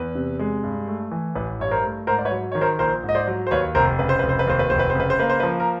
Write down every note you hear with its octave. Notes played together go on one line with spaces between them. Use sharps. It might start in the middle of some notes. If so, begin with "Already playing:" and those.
Already playing: E2 B4
C3
G#3
G2
A3
E3
A1 B4
G2 C#5
A#4 C5
A3
G#2 A#4 C5
D5
B4 C#5
F#3
D#3 C#5
A#4 C5
A#1 A#4 C5
G#2
D#5
C5 D5
F#3
C5
D#2 B4 C#5
F1 A#4 C5
C#3 B4
C5
F1 B4
C5
B4
D#2 C5
B4
F1 C5
B4
C#3 C5
B4
C5
A#3 B4
C5
B4
F3
A#4